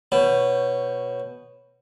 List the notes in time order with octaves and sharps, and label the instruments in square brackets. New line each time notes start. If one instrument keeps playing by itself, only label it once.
[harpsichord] B2 [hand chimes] C#5